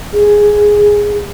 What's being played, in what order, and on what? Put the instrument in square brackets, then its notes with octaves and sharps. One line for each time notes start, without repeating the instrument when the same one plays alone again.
[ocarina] G#4